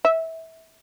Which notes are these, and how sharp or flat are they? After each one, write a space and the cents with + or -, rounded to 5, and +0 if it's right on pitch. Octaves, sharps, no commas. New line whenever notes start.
E5 -20